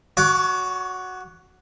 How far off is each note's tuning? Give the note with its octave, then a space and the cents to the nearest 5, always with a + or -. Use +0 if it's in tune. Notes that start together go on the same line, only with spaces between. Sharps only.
F#4 +0 C#5 +35 D6 +0